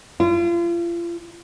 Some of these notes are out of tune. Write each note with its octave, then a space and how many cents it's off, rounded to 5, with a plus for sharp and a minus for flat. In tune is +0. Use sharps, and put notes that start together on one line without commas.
F4 -35